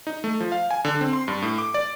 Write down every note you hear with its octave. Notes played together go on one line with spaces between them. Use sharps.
D#4
A3
F3
F5
G#5
D3
C4
C6
G2
A2
D6
D5